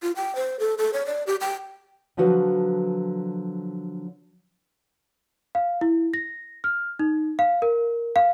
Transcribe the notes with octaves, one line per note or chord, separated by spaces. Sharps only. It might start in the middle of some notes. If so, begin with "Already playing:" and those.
F4
G5
C5
A4
A4
C#5
D5
G4
G5
D3 F3 F#3 F#4 B4
F5
E4
A#6
F6
D#4
F5
A#4
F5